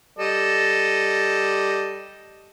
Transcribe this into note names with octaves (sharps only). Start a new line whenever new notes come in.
G3 A4 D#5